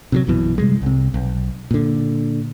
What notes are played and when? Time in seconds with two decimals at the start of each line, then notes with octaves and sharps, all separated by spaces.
0.12 C3 E3 F#3
0.27 A#1 F#2 B2 E3
0.58 C3 G3 G#3
0.82 C2 C3
1.14 B1
1.71 A#2 D3